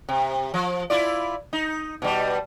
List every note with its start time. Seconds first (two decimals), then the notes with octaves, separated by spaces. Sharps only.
0.09 C3
0.54 F3
0.90 E4 F4 D5
1.53 D#4
2.02 B2 G3